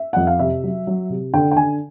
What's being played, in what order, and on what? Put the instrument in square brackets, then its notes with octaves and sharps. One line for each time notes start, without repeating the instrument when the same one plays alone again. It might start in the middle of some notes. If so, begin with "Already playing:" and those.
Already playing: [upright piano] E5
F2 F#5
F5
C3 E5
F#3
F#3
C3
D3 G5
G5
D3 G#5